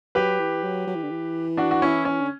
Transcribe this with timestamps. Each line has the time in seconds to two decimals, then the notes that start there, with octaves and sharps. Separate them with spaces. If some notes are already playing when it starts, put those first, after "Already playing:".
0.15 F#3 G4 B4
0.40 E3
0.63 F#3
0.87 F#3
0.95 E3
1.03 D3
1.10 E3
1.57 D4 F#4
1.71 F#4
1.82 C#4 E4
2.05 C#4
2.21 D3